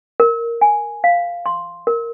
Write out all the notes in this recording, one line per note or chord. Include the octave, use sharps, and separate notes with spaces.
A#4
G#5
F5
C6
A#4